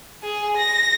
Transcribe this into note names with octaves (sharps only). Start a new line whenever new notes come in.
G#4
A#6